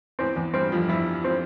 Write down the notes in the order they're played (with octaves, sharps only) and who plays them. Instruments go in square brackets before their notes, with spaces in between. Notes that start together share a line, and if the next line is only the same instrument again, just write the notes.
[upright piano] E2 E3 [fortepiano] C4
[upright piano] E2 E3
[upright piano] G2 G3 [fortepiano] C4
[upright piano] F2 F3
[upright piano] G2 G3 [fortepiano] E4
[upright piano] F3 [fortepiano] C4